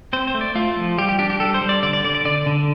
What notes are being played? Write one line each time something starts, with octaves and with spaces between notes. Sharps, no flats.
C4 C5
C5
A3
D5
A3 F4
F3
G3 G4
G4
D4 G4
G4
G3 A4
C5
G3
D5
D3 D5
D5
D3 D5
D5
D3 D5
D3